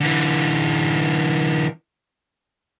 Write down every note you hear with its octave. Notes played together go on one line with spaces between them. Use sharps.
D3 E3